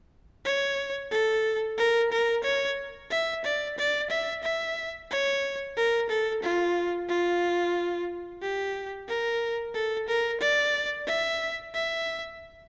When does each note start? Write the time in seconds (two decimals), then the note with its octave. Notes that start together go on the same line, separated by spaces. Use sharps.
0.45 C#5
1.11 A4
1.78 A#4
2.12 A#4
2.44 C#5
3.11 E5
3.44 D5
3.78 D5
4.10 E5
4.43 E5
5.11 C#5
5.77 A#4
6.09 A4
6.43 F4
7.09 F4
8.42 G4
9.08 A#4
9.74 A4
10.08 A#4
10.41 D5
11.07 E5
11.74 E5